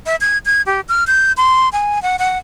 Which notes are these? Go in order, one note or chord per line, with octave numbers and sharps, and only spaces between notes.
E5
G#6
G#6
G4
F6
G6
C6
G#5
F#5
F#5